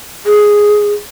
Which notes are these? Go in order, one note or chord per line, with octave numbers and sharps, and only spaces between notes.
G#4